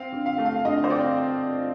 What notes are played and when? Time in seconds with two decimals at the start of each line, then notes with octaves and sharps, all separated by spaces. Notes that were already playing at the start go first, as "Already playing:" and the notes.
Already playing: C4 F5
0.12 D3
0.26 F5
0.38 A3
0.45 F5
0.65 D3 D#5
0.84 C5
0.90 C4 D5